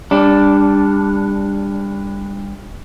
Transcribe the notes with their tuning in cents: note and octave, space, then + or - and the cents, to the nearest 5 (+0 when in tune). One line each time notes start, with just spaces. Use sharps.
G3 +30 D4 +0